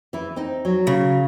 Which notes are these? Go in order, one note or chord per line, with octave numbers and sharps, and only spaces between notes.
E3 E4
C4 D#4
F#3
C#3